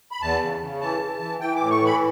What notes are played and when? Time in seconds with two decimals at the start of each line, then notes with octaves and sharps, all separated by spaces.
0.11 B5
0.21 E2 A5
0.42 C#3
0.62 C#3
0.81 E3 A5
1.01 E3
1.21 E3
1.41 E3 G5
1.56 D6
1.61 A2
1.71 C#6
1.81 E3
1.86 B5